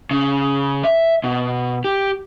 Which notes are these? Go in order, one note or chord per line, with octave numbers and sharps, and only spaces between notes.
C#3
E5
B2
G4